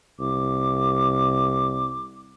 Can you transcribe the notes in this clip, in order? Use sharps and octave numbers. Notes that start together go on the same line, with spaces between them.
C2 D6